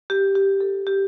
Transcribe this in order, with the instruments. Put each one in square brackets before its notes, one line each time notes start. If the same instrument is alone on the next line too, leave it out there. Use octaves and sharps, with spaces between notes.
[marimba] G4
G4
A4
G4